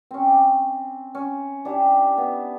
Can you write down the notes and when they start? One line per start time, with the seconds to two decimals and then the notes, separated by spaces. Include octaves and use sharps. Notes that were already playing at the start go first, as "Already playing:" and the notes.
0.11 C4 C#4
0.27 D6
1.15 C#4
1.65 D4 E4 G4
2.17 B3